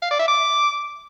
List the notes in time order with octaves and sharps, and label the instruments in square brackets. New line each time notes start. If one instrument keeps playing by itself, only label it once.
[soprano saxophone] F5
D5
E5
D6